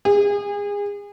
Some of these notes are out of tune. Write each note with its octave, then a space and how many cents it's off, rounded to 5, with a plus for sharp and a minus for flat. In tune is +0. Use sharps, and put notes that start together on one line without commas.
G#4 -30